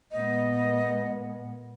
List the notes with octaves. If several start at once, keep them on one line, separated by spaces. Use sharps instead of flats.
A#2 G#3 B3 D#5